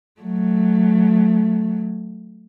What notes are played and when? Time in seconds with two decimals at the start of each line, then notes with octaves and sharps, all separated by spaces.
0.21 F#3 A3